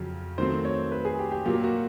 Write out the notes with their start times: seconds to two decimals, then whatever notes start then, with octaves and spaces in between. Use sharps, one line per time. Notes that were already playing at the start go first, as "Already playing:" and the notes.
Already playing: F2 C#3 F#3
0.38 D#3 F#3 A3 C4 C5
0.65 C#5
0.92 B4
1.05 G#4
1.19 G4
1.31 G4
1.45 A#2 F#3 A#3 G4
1.63 F#4